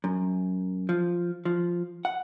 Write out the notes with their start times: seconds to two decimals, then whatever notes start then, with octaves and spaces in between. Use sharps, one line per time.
0.04 F#2
0.89 F3
1.45 F3
2.05 F#5